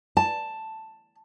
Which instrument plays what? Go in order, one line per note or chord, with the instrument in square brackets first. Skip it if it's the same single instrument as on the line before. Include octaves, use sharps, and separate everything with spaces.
[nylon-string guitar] A5